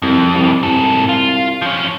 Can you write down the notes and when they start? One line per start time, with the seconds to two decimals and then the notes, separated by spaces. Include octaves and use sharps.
0.02 C2 F2
0.34 C2
0.63 C2 G#2 A4
1.09 F4
1.62 F3 C#4